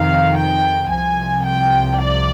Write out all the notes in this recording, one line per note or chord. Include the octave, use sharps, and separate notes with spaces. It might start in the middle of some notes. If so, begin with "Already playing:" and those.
Already playing: F2 C3 D#3 F5
G5
C2 C3 F3 G#5
G5
D5